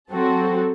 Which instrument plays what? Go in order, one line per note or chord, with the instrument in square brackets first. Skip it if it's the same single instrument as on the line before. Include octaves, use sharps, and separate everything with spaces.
[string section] F#3 C4 F#4 A4